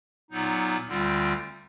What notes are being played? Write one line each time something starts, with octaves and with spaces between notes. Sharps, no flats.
A#2 F#3 B3 D#4
D2 D3 G3 C4 F4